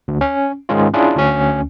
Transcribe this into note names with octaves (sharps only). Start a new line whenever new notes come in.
D2
C#4
G#2 D#3 G#3 C#4 D#4 F4
C#4 D4 E4 F4 G#4
D2 C#4